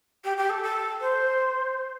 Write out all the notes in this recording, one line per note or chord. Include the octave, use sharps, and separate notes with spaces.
G4
G4
A4
A4
C5